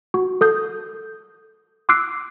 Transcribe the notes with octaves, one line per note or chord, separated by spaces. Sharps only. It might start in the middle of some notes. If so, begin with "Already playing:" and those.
F#4
A4 D#6 G6
C6 D6 E6 F#6 C7 D7